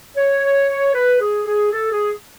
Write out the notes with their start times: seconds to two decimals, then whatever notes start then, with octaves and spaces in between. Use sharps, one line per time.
0.17 C#5
0.94 B4
1.20 G#4
1.46 G#4
1.72 A4
1.91 G#4